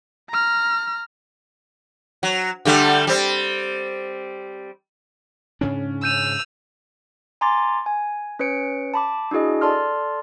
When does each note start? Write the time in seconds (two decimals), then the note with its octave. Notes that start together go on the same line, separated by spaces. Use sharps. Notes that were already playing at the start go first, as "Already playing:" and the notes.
0.30 A#5 F6
2.23 F#3
2.65 D3 G3 A3
3.07 G3 C4
5.61 G#2 C#3 C#4 D4
6.04 E6 G6 D#7 F7
7.41 G#5 A#5 C6 D6 A6
7.86 G#5
8.39 C#4 B4 C#5 C#7 D7
8.94 A5 B5 D6
9.31 D4 E4 F#4 G#4 D#5
9.61 A4 D5 A5 C6 F6